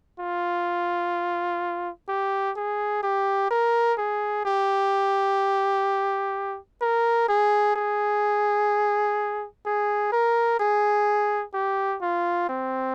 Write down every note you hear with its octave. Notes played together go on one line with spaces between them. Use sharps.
F4
G4
G#4
G4
A#4
G#4
G4
A#4
G#4
G#4
G#4
A#4
G#4
G4
F4
C4